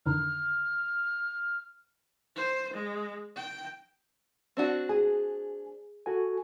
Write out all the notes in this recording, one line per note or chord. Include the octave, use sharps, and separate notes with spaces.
F2 D3 D#3 F6
C5
G#3
G5
C4 D4 F#4
G#4 G#5
F#4 A4 G#5